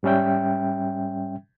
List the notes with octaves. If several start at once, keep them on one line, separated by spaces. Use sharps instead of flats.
G#2 G3 C#4 E5 G5